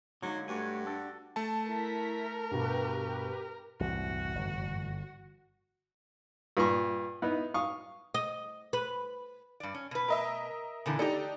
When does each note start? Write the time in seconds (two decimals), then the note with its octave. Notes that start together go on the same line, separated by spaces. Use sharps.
0.22 D3 F#3 G#3 A#3 D#4
0.48 G2 A3 F#4 G4 C#5 G#5
0.87 D4 A4
1.36 A3 A5
1.68 E4 A#4 B6
2.51 G2 B2 G4 B4
3.80 F#1 C2 A2 E3 F#4
4.35 G1
6.57 G2 A#2 C#6
7.22 B3 D#4 E4
7.54 F5 C#6 D#6
8.14 D#5
8.73 B4
9.60 G2 D5
9.74 C#4
9.91 B2 B4
10.08 A#4 D#5 E5
10.86 A#2 D3 E3
10.99 D4 D#4 G4 A4 A#5